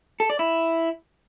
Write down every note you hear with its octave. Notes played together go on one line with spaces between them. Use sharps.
A4
D5
E4